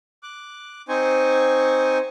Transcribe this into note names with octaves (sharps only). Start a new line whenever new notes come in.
D6 F#6
C4 D#4 C5 G#5 C#6